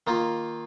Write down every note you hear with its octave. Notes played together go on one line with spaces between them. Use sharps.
D#3 A#3 F4